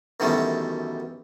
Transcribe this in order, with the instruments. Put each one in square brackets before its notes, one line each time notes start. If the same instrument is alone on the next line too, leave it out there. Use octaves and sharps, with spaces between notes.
[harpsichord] F#2 B2 D#3 E3 G3 A3